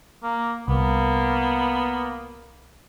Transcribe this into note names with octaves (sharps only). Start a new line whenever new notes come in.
A#3
C2 A#3 B3